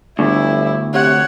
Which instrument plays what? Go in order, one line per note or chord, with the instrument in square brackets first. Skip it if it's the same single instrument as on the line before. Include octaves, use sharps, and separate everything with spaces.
[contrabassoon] G1 [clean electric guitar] D2 [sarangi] E4
[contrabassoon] C3 [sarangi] C#5 [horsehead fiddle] F#5